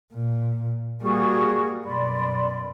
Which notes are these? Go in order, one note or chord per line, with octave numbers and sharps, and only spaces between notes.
A#2
G3 A#3 F#4 G#4 C#6
F#2 B2 D5 B5 C6